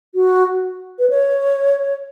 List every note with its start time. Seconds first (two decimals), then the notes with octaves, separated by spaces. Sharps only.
0.15 F#4
0.99 B4
1.10 C#5